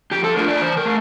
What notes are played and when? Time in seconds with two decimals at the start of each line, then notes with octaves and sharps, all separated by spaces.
0.11 F3 G4
0.24 A4
0.36 A3 D4 F4 A#4
0.48 D5
0.61 E3 C5
0.77 A#4
0.85 A3